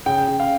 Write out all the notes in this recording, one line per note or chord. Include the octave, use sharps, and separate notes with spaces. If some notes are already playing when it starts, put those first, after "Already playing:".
C#3 G5
C#3
F5